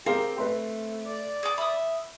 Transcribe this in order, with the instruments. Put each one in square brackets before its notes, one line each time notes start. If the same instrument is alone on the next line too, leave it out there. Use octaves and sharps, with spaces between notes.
[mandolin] C4 [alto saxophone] G4 [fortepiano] G#4 A#4 F5
[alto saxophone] A3 [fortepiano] B4 C6
[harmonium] D5
[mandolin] G#4 D6
[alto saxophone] E5 [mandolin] B5 D#6